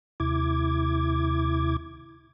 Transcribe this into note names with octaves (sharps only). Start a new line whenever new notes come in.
D#2 C3 E4 D6 G#6